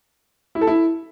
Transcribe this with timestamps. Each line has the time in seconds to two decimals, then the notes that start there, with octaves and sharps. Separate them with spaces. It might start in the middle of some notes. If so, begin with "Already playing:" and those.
0.55 E4
0.61 A4
0.67 E4